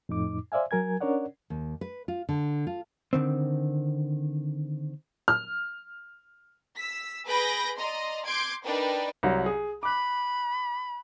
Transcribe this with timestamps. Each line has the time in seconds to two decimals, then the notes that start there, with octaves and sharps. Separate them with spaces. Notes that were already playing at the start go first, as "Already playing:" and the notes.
0.09 F2 A2 D#4 D6
0.52 C5 D5 E5 F5 G#5
0.71 F#3 A#4 G#5 G#6
1.01 C#4 D4 A#4 C#5 D5 F#5
1.50 D#2
1.81 B4
2.08 F4
2.29 D3
2.67 F4
3.13 D3 D#3 C4
5.28 F6
6.77 E6 B6
7.26 G#4 B4 B5 G6 A#6 D7
7.78 D5 D#5 A#5 C6
8.25 C6 D6 G6 G#6 C7 D7
8.64 D4 D#4 A#4 B4 D5 G5
9.23 C2 F#3 A#5
9.46 G#4
9.83 B5 D6 F#6